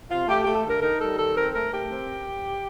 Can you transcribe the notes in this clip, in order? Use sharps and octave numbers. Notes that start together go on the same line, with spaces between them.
C3 F4
A3 G4
A3 G4
A4
D3 A#4
D#4 A#4
G3 A4
D#3 A4
C4 A#4
A3 A#4
A3 G4
C4